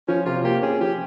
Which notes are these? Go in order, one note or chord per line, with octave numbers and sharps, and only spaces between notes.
F3 C#4
C3 F4
A#3 G4
C#4 G#4
F3 G4